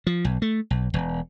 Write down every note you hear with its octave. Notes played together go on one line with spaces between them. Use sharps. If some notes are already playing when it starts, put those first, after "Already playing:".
F3
B1
A3
B1
E1